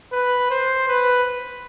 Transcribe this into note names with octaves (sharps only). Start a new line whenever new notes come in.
B4
C5
B4